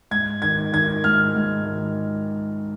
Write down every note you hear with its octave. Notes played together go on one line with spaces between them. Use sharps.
G#2 G#6
D#3 G#6
D#3 G#6
G#2 F6
G#2
D#3